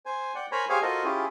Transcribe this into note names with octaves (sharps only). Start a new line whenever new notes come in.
C5 G#5
D5 F#5 G5
A#4 C5 C#5 G#5 A#5 B5
G4 G#4 C5 C#5 F5 G#5
F4 F#4 A4 A#4 C5 D#5
C#4 E4 F4 G4 G#4